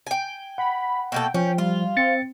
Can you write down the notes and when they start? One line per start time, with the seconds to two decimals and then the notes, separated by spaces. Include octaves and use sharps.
0.07 G5 G#5
0.58 F#5 B5
1.12 B2 A#3 A4 G5
1.34 F3 C#4
1.58 G3 F4
1.97 C4 A6 C#7